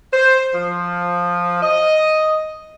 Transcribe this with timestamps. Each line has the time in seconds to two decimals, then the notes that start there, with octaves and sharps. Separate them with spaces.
0.12 C5
0.53 F3
1.61 D#5